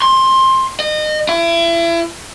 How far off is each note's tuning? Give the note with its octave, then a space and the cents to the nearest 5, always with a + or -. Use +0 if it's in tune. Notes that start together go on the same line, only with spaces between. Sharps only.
C6 +15
D#5 -30
E4 +35